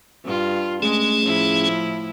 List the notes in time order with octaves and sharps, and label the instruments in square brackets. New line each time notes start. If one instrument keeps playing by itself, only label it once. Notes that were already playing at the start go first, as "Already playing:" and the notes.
[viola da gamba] G2 F4
[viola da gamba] G#3 [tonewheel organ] A3 C#4 G#4
[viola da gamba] A2 F3 E4